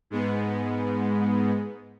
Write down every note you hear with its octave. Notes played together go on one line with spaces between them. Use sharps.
G#2 G#3 B3